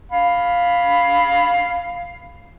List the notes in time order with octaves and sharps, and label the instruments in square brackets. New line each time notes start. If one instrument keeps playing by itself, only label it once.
[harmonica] F5 B5